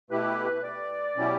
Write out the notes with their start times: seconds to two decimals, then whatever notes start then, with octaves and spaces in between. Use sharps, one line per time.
0.11 B2 A3 E4 G4 B4
0.63 D5
1.16 B2 F#3 C#4 E4 G4